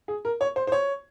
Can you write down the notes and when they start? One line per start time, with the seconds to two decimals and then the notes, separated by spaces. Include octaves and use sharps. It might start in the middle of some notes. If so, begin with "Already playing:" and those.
0.08 G#4
0.25 A#4
0.41 C#5
0.56 C5
0.67 C5
0.72 C#5